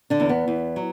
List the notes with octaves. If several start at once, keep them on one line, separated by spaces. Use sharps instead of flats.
D3 D4
E2
B3
E2
F#3